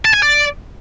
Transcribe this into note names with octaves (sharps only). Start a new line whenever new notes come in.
A5
G#5
D5